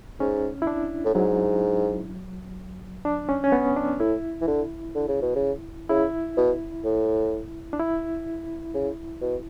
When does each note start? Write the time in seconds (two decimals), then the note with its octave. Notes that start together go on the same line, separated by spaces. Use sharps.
0.20 G#2 C#4
0.62 E4
0.67 D4
1.05 A2
1.15 G#2 F#3
3.05 D4
3.29 C#4
3.44 C#4
3.52 B3
3.76 D4
4.00 A2 E4
4.41 E3
4.47 D3
4.95 D3
5.08 C#3
5.22 B2
5.36 C#3
5.90 C#3 E4
6.37 B2
6.84 A2
7.73 D4
7.80 E4
8.74 C#3
9.22 B2